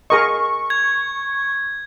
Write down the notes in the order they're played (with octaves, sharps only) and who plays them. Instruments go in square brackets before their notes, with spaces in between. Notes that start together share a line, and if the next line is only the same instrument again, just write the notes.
[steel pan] G#4 A#4 D#5 [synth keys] C#6
[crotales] G#6